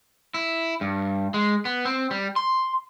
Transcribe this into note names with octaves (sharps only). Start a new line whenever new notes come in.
E4
G2
G#3
B3
C4
G3
C6